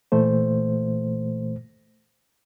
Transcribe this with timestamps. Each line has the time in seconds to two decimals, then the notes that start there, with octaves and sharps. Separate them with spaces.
0.12 A#2 E3 A3 C5